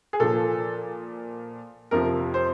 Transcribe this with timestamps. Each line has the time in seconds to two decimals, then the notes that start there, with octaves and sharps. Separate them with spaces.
0.13 G#4
0.20 A#2 F3 A4
1.91 F2 C3 F3 A#4
2.34 C5